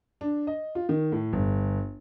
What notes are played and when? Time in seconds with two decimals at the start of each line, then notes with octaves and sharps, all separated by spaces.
0.21 D4
0.47 D#5
0.75 F4
0.89 D#3
1.12 A2
1.33 G1